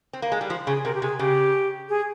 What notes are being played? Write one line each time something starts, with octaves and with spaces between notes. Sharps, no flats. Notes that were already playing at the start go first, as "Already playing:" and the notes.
C4
A#3
G#3
G3
F3
C#3 G#4
C3 A#4
G4
C3 G#4
C#3 G4
G#4